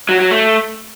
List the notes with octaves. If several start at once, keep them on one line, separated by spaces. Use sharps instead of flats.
F#3
F#3
A3